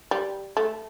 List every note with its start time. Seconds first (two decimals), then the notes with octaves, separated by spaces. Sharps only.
0.11 G3
0.57 A3